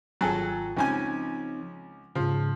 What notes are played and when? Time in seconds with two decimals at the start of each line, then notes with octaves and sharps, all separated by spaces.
0.21 G#1 F#3 F4 G#4 A4 G5
0.77 C#2 F3 C4 C#4 D#4 G#5
2.15 G#2 C#3 F3